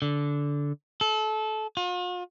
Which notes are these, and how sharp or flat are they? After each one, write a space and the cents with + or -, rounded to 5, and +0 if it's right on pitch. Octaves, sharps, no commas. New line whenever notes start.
D3 -15
A4 -25
F4 +45